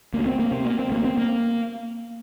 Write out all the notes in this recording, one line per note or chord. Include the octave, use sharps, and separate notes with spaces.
D2 A#3
C4
A#3
C3 C4
A#3
C4
D2 A#3
C4
A#3